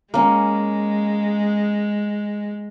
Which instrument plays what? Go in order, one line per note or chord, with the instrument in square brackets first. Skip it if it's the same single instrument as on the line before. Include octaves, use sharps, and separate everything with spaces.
[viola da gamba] G#3 [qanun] A#3 C#4